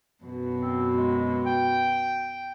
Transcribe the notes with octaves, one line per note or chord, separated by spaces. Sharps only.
F#2 B2
C4
G#3
G5